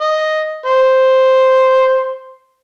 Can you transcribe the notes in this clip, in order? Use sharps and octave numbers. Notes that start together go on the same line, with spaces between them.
D#5
C5